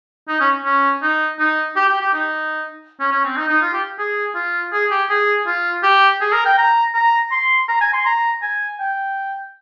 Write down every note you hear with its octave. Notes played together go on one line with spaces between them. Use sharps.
D#4
C#4
C#4
D#4
D#4
G4
G4
G4
D#4
C#4
C#4
C4
D#4
D#4
F4
G4
G#4
F4
G#4
G4
G#4
F4
G4
G#4
A#4
G5
A#5
A#5
C6
A#5
G#5
C6
A#5
G#5
G5